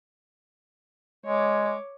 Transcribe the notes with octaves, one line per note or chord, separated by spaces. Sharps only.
G#3 C#5 D6